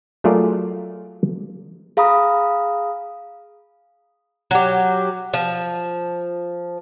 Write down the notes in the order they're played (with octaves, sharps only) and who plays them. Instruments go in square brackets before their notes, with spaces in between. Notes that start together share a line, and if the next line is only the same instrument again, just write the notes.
[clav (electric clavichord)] F#3 A3 F4 G#4 A#4 D5
[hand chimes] G#4 F5 A#5 B5 D#6
[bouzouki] F#3 G4
F3